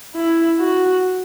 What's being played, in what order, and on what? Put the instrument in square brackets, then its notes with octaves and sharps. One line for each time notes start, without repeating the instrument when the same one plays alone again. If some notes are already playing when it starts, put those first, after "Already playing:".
[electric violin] E4
F#4